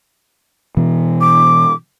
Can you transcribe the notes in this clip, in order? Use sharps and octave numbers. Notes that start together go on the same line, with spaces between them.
B2 E3 B3
D6